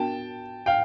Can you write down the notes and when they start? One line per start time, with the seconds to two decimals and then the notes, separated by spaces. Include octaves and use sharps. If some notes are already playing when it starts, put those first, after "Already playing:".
Already playing: B3 D4 F#4 A#4 G5 A5
0.66 F5 G5